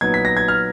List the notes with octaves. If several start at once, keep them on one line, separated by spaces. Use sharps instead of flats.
A#2 F#3 B3 D#4 G#6
B6
A#6
G#6
F6